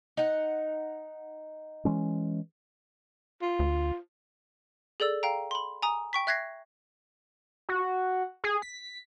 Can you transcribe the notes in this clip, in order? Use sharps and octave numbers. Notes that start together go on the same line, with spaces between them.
D#4 F#5
E3 G#3 C#4
F4
D2
G#4 A4 D5 E6
F5 G5 A#5
B5 C6
G#5 A#5 D#6
G5 C#6 B6
E5 F#6 G#6 A#6 C7
F#4
G#4
B6